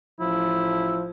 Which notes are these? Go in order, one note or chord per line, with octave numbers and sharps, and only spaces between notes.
A1 F3 E4